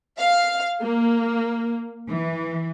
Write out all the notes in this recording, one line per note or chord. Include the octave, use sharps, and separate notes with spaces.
F5
A#3
E3